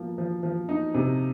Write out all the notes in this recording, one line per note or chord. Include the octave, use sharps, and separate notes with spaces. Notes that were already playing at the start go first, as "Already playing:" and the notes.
Already playing: F3 A#3
F3
F3
D#4
C3